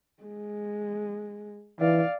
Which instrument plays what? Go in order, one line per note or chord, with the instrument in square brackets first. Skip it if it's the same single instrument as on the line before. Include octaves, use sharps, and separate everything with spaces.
[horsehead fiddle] G#3
[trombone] E3 [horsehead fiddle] D5 F5